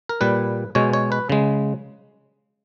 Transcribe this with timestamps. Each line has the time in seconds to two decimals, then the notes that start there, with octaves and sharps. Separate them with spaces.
0.09 A#4
0.21 A#2 G3 B4
0.75 B2 G#3 C#5
0.93 C#5
1.12 B4
1.30 C#3 G#3